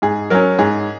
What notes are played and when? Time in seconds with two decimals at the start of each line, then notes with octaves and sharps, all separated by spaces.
0.02 G#2 G#4
0.30 F#3 C#4 A#4
0.59 G#2 G#4